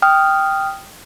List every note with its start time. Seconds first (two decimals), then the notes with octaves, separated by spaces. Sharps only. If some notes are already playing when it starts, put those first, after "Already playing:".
0.02 G5 D#6 F6